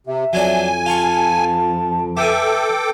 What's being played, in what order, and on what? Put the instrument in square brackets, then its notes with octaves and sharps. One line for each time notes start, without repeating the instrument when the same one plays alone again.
[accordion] C3 [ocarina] E5
[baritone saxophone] F2 [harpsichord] F#3 D4 D5 [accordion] G#5
[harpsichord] F4 C#6 [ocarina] A5
[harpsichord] A3 G#5 [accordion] A4 G5 D6 [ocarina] B4